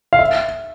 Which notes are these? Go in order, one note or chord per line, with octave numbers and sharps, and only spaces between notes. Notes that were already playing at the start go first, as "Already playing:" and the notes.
F5
E5